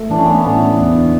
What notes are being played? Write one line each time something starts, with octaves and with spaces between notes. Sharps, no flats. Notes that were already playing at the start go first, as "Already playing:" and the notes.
Already playing: A3
E3 D4
C#4
A3 B3
C#4
A2 B3 D4
E3
E2
D3